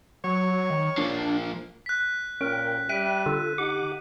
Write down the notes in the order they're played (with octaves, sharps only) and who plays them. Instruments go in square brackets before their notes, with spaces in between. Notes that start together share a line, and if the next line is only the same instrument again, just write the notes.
[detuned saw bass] F#3 [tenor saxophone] C#5
[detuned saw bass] D#3
[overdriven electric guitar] F3 A#3 [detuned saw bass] D4
[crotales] F#6 B6
[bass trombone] A#2 [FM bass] C#4 [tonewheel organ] A#4 G5
[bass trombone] G3 [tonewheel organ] E5 G5 F#6 [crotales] D#7
[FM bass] D3 [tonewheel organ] F4 A4
[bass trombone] D#4 [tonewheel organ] G4 F#5 D6